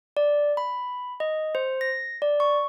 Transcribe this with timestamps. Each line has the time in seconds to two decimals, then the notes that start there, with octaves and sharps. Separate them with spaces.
0.17 D5
0.57 B5
1.20 D#5
1.55 C5
1.81 A#6
2.22 D5
2.40 C#6